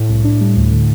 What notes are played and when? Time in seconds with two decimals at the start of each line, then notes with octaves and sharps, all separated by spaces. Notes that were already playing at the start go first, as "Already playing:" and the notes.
Already playing: A2
0.09 C2
0.24 D4
0.41 G3
0.56 D2
0.72 D3